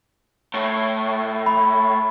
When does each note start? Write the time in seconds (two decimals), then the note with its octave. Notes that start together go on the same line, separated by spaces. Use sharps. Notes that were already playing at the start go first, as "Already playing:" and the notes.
0.54 A2
1.46 B5